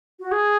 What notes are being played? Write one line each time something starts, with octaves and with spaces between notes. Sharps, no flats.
F#4
G#4